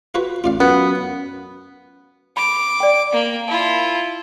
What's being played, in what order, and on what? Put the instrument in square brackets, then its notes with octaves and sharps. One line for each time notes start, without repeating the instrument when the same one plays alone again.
[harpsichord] F4 F#4 B4
[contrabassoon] A1 [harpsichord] F4 D5 F5
[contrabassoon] F#2 [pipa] B3
[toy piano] B5 [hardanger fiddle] D6
[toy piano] D5 G5
[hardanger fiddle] A#3
[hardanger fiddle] E4 F4 [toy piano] A5